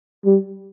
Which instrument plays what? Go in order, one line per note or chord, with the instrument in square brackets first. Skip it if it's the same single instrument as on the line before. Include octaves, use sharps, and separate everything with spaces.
[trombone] G3